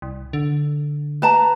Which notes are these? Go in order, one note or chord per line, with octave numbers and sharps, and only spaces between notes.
C2
D3
B4 A5 A#5